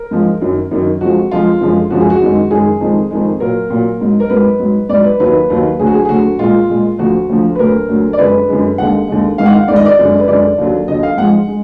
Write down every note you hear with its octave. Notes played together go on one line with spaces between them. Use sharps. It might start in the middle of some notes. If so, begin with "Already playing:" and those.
Already playing: A#4
G#2 F3 G#3
F#2 D#3 F#3
F#2 D#3 F#3
F2 F3 G#3 F#4
F2 F3 G#3 F4
F#2 D3 F3 G#3
F#2 D3 F3 G#3 F#4
G#4
F#4
F#2 D#3 G#3
F#2 D#3 G#3 G#4
F2 D#3 G#3
F2 D#3 G#3
A#2 F#3 A#4
A#2 F#3
G#2 F#3
A#4
G#2 F#3 B4
G#2 F#3
G#2 F#3 D5
B4
D#2 D#3 F#3 B4
D#2 D#3 F#3
D2 D3 F#3 G#4
F#4
G#4
G#4
D2 D3 F#3 F#4
A#2 G#3 F4
A#2 G#3
D2 D3 F3 F#4
D2 D3 F3
B4
D2 D3 F#3 A#4
D2 D3 F#3
D5
F#2 D3 G#3 B4
F#2 D3 G#3
D#2 D3 G#3 F#5
D#2 D3 G#3
G#2 D#3 G#3 F5
F#5
F5
G#2 D#3 G#3 D5
D#5
D5
F#2 D3 G#3
B4
F#2 D3 G#3 D5
D#2 D3 F#3
D#2 D3 F#3 D#5
F5
G#2 F3 G#3 F#5
G#3